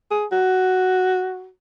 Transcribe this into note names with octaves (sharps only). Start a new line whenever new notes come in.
G#4
F#4